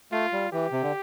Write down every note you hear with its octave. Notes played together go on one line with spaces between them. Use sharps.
A3 F4
G3
E3 G4
C3
D3